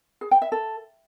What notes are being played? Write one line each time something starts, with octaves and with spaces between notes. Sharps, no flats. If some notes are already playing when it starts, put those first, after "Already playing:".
G#4
G5
E5
A4